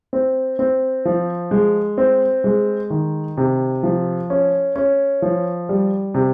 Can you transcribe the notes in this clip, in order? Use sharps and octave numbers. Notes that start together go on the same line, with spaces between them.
C4
C4
F3
G#3
C4
G#3
D#3
C3
F3
C#4
C#4
F3
G3
C3